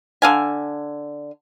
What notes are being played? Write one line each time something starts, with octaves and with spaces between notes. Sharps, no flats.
D3 F5 G#5